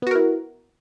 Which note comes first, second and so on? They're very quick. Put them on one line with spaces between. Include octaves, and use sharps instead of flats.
B3 F#4 A#4 E4